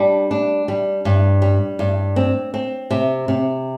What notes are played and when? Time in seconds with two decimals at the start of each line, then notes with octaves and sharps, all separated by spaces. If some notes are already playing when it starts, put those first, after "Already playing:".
Already playing: G3 D4
0.31 D4
0.68 G3
1.05 G2
1.42 G3
1.79 G2
2.16 C4
2.54 C4
2.91 C3
3.28 C3